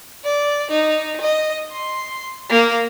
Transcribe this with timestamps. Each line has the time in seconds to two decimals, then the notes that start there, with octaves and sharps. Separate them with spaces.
0.24 D5
0.70 D#4
1.20 D#5
1.71 C6
2.49 A#3